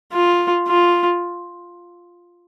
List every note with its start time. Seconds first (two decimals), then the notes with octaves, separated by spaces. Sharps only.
0.12 F4
0.67 F4